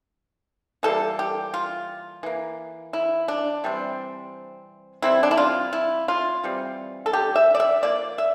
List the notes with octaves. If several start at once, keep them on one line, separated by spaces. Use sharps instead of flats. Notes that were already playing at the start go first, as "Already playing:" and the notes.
E3 G3 A#3 A4
G4
F4
E3 A#3
E4
D4
C3 E3 G3 C4
E3 G3 C4 E4
D4
E4
F4
E4
F4
E3 G3 C4
A4
G4
E5
D5
E5
F3 A#3 D5
E5